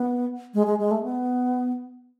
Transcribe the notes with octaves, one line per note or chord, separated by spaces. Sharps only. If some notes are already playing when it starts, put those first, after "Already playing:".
Already playing: B3
G#3
G#3
G#3
A3
B3